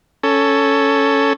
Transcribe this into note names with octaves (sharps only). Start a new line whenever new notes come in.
C#4 A4